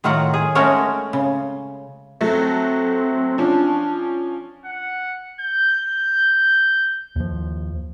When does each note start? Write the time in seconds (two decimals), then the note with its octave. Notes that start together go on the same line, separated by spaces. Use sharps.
0.04 A2 D#3 F#3 F4 F#4 F#5
0.34 G#4
0.55 G#3 A3 C#4 F#4 A#4 C#5
1.13 C#3
2.21 F#3 A3 C4
3.38 F3 C#4 D4
4.65 F#5
5.41 G6
7.16 D#2 F3